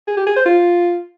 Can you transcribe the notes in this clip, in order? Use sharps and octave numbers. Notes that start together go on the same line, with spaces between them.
G#4
G4
G#4
C5
F4